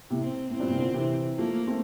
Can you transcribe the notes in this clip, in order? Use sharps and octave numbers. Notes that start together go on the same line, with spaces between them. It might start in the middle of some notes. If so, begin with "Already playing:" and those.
A2 C3
C4
A2 C4
G2 A#2
A2 C3
A#2 D3
C3 E3
F3 A3 A#3
A3 C4